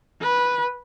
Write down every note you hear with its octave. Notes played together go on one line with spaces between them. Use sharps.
B4